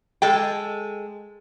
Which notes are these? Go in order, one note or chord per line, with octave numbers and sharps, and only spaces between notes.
G#3 A4 G5